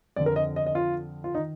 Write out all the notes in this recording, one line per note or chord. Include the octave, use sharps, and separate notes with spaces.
F2 D3 D5
A#4
D#5
D#5
D#5
F4
F4
D#3 D#4